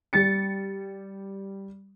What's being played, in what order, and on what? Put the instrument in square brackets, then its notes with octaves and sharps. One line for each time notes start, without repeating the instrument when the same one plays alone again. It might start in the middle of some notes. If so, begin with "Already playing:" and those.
[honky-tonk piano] G3 A6 C#7